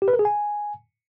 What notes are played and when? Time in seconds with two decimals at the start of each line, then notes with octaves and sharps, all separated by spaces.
0.02 G4
0.08 B4
0.14 A#4
0.19 G#4
0.25 G#5